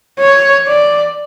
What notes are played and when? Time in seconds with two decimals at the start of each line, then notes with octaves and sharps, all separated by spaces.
0.20 C#5
0.67 D5